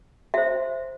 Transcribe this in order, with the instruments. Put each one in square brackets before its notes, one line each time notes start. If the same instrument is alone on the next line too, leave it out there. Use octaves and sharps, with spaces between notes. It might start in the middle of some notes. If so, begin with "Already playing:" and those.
[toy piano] F#4 C5 E5